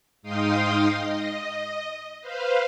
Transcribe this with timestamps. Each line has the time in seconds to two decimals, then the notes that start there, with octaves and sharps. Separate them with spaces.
0.22 G#2 D#4 F5 G5 C6 D#6
0.94 D#5
2.21 B4 C5 F5